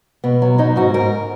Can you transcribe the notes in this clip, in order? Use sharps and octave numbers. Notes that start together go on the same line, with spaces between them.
B2 B3
F#3
F#3 D#4
G#2 F#4
G#2 A#4